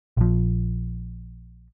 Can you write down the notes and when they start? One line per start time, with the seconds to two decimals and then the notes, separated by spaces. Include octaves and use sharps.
0.17 A#1 F3